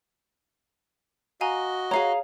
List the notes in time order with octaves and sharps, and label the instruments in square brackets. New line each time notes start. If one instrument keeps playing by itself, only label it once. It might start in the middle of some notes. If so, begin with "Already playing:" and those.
[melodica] F#4 D#5 [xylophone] F5 G#5 A#5
[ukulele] G#4 F5 A#5 [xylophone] C#5